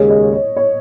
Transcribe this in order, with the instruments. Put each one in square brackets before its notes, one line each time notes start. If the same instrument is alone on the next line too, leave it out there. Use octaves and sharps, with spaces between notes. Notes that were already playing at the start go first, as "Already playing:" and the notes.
Already playing: [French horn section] D#2 C#3 G#3 [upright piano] C#5
[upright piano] D#5
C#5
C#5